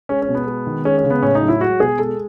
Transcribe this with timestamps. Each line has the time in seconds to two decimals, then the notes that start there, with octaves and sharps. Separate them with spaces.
0.09 G#3 C#4
0.22 C#4
0.28 B2
0.35 B3
0.47 G#3
0.67 D#3
0.85 G#3 C#4
0.98 C#4
1.04 C#3
1.10 B3
1.22 A2 C#4
1.35 D#4
1.42 F#3
1.48 E4
1.61 G#3 F#4
1.80 B2 G#4
1.99 G#3 A4